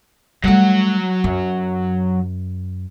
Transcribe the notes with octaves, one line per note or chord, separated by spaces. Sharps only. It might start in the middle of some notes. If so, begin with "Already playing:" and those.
F#3 G3 A3 F#5
F#2